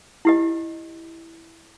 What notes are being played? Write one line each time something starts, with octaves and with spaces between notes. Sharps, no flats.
E4 G4 D#5